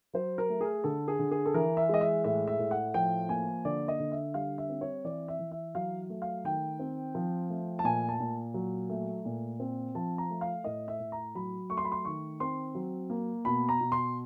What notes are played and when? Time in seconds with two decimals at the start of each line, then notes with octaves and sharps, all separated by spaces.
0.14 F#3 C5
0.38 A#4
0.50 A3
0.61 G#4
0.84 D3 A4
1.08 G#4
1.19 D3
1.31 G#4
1.46 A4
1.54 E3 A#4
1.77 E5
1.89 G#3 D#5
2.01 E5
2.24 A2 E5
2.48 E5
2.59 A2
2.71 F#5
2.94 F3 G5
3.29 A#3 G#5
3.65 D3 D5
3.88 D#5
4.00 D3
4.12 E5
4.34 G3 F5
4.58 E5
4.69 C4
4.81 C#5
5.04 E3 D5
5.28 E5
5.39 E3
5.51 E5
5.75 F#3 F5
6.10 A3
6.22 F5
6.44 D#3 G5
6.79 C4
7.15 F3
7.50 A3
7.79 A5
7.84 A#2 G#5
8.09 A5
8.20 A#2
8.54 F#3
8.89 A3
9.25 A#2
9.60 C4
9.95 F3 A5
10.18 A#5
10.30 A3
10.41 F5
10.64 A2 D#5
10.88 E5
11.00 A2
11.12 A#5
11.35 F#3 B5
11.70 A3 C#6
11.77 C6
11.85 B5
11.92 C6
12.05 D#3 C#6
12.40 C4 C6
12.75 F#3
13.10 A#3
13.45 B2 B5
13.69 A#5
13.80 B2
13.92 C6